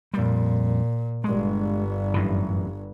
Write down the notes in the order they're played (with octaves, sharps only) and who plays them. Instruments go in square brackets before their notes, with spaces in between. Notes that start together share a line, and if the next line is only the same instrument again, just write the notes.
[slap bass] F2 G3 [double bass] A#2
[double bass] G1 G2 [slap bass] G#3
[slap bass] F#2 A2 E3